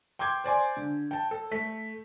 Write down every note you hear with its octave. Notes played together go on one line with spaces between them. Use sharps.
G5 C6 D6 G6 G#6
C5 D5 G#5 C6
D3
G5 A5
A4
A3 B6